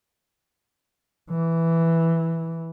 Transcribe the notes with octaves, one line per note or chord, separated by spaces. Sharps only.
E3